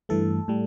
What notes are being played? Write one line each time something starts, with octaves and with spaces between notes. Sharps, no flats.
G2 E3 A3 A4
A2 G3